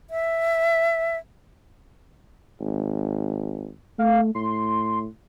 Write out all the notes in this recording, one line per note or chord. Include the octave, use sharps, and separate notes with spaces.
E5
G#1
A3 F5
A2 C6